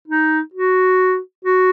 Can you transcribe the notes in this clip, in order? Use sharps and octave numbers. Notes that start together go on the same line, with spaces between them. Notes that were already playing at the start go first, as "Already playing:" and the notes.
D#4
F#4
F#4